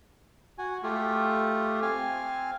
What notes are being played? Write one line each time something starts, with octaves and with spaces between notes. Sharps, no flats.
F#4 G#5
A3 F4 G4
C4 F5 G#5